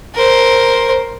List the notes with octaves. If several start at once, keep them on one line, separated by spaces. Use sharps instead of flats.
A#4 C5